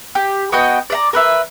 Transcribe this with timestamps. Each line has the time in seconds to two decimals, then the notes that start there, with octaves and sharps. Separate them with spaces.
0.15 G4
0.52 B3 F#4 D#5 G5
0.90 D5 E5 A#5
1.13 A#4 B4 E5